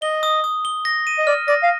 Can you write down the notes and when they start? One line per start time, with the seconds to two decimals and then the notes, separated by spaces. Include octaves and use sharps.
0.02 D#5 G7
0.23 D#6
0.44 D#6
0.65 G7
0.85 A#6
1.07 D#7
1.18 D#5
1.27 D5 F6
1.48 D5 A#6
1.63 F5